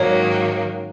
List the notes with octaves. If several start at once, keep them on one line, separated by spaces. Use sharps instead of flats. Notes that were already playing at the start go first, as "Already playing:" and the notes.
Already playing: G#2 D#3 F#3 A#3 C#4 C#5